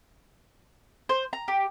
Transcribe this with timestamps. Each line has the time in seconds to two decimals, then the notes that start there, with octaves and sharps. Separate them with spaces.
1.09 C5
1.33 A#5
1.48 G4